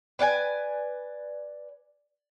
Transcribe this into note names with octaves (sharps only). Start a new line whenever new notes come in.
B4 D5 F#5 G#5